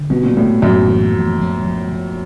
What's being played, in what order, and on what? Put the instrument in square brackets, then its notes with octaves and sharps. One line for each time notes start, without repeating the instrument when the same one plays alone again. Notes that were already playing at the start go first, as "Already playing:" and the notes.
Already playing: [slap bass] D3
[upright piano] B2 [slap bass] G3
[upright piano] A#2
[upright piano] A2 [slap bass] G3
[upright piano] F#2 [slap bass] A2
[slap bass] E3
F3
F3
F3
F3